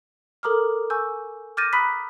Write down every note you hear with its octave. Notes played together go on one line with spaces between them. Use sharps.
A4 A#4 A#5 D6 D#6 F6
G#5 C#6 E6 G6
D6 F6 G6 A6 A#6 D#7
A#5 B5 D#6 F#6 B6